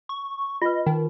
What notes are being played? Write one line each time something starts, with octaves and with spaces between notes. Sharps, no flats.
C#6
F4 B4 D#5
D#3 D#4